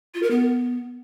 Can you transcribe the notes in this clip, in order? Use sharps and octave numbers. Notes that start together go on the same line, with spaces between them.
F4
A#4
B3